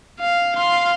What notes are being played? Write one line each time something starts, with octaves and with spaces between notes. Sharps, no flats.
F5
F5 C6